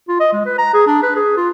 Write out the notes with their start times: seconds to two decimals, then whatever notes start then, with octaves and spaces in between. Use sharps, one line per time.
0.08 F4
0.20 D#5
0.33 G#3
0.46 B4
0.58 A#5
0.74 G#4
0.87 D4
1.03 B4
1.16 G#4
1.37 F4